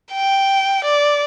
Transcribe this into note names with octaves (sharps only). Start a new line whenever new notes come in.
G5
D5